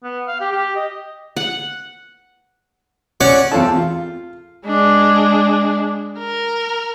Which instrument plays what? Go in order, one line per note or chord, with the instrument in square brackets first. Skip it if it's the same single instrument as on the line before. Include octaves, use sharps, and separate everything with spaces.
[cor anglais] B3
F5
G4
G4
D#5
[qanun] F#5
[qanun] C#4 [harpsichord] C#5 D5 F#5
[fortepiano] E2 C4 F4 A4 A5
F4
[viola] G#3 D4
A#4